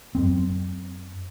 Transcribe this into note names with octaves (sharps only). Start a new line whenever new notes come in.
F#2 C4